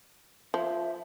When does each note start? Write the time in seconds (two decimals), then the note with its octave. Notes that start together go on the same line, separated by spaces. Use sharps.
0.54 F3 E5